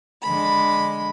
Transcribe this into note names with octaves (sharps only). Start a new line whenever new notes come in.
D3 G#3 B5